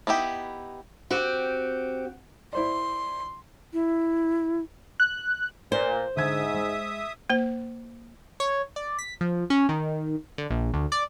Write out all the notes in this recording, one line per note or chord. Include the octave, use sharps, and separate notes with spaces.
B3 D#4 E4 G4
C4 F#4 G4
E4 C5 D5 C6
E4
F#6
A#2 C5
G#2 D3 E5 D#6 G#6
G#3
A#3 C5
C#5
D5
B6
F3
C#4
D#3
D3
A#1
D2
D5